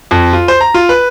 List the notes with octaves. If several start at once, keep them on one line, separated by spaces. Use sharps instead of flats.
F2
F4
C5
A#5
F4
B4